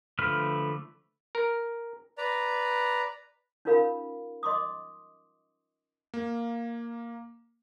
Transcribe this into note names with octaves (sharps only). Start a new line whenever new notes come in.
D3 F3 A3 B4 F6
A#4
B4 D5 A#5
C#4 D#4 F4 A#4 F5 B5
D#5 C6 D6 D#6
A#3